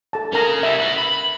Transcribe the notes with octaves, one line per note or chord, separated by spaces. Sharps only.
A4 A5
C#4 G#4 A#4 A#5
G3 E4 E5
F#4 B4
B5